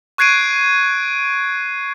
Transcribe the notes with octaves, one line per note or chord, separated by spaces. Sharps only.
C#6 F#6 G#6 C7 D7 D#7